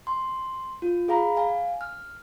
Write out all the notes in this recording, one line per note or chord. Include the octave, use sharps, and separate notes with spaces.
C6
F4
G#4 F5 A#5 B5
F5 G#5
F6